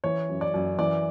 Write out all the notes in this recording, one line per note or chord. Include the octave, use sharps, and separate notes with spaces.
E3 C#5
F#2
D5
F#2
E3 D5